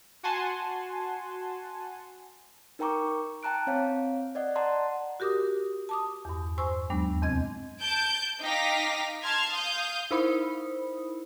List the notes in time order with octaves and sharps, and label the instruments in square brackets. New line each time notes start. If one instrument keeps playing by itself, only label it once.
[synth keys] F#4 F#5 G#5 A5 C6
[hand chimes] D#4 A#4 G5 A#5 C#6 D6
G5 A5 A#5 F#6 D7
C4 C#5 F5
D5 D#5 F#5
D5 F#5 A5 A#5 C6
[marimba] F#4 G4 A#4 D6 D#6
A5 D6 D#6
E2 G2
C5 G#5 C6 C#6 E6
D#2 F#3 G#3 B3 D4
E2 C3 C4 D#5 G#6
[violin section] A5 G6 D7
D#4 F5 G5 D6 A#6 B6
A5 C6 F6 G#6
F5 D#6 G6
[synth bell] D#4 E4 A#4 C5 B5 D#6